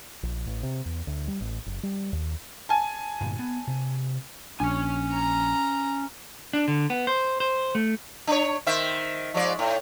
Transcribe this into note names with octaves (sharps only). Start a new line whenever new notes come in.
A#1
A1
C3
E2
D2
G3
A1
F#1
G3
D#2
G#5 A5
G2 A#2 D3
B3
C3
A#1 C#4 D4 G#5
A#5
D4
D3
B3
C5
C5
A3
D4 C#5
D#3 C5 E5
F3 G#3 D5
A2